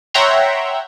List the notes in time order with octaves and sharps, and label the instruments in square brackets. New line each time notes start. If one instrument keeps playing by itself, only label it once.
[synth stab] C#5 E5 F#5 G5 A#5 C6